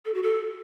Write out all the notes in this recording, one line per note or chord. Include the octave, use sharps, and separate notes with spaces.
A4
F#4
A4